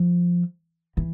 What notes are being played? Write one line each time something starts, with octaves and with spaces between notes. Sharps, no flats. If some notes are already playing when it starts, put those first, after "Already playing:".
Already playing: F3
E3